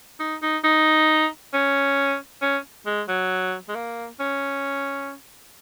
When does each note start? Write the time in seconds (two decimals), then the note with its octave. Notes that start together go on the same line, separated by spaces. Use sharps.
0.20 D#4
0.42 D#4
0.64 D#4
1.54 C#4
2.42 C#4
2.86 G#3
3.08 F#3
3.69 G#3
3.75 A#3
4.20 C#4